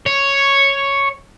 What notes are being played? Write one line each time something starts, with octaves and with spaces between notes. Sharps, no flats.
C#5